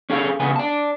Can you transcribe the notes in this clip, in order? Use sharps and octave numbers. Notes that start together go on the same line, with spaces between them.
C#4 G#4 A4 F5
C#3 B3 G#5
D5 A5